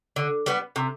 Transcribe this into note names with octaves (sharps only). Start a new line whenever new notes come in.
D3
G3 B3
C3